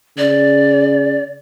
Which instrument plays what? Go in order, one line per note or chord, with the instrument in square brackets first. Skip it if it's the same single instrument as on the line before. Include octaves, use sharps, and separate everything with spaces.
[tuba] C#3 [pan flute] D5